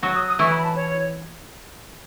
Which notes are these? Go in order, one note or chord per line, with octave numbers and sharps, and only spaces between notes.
F#3 F#4
D#6
D#6
E3 E4 C#6
B5
A5
C#5